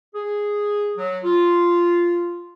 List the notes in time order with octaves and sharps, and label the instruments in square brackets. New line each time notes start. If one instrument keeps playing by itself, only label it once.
[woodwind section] G#4
F#3
F4